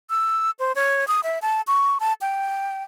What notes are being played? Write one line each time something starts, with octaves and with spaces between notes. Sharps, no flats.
E6
C5
C#5
D#6
E5
A5
C#6
A5
G5